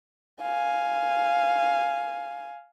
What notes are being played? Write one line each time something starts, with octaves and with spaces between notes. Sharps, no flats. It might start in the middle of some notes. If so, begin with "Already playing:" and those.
F5 G#5